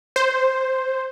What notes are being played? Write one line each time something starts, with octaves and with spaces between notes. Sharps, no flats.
C5